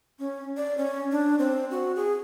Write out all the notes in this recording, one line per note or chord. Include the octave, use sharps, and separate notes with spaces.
C#4
D5
C#4
D4
C4
F#4
G#4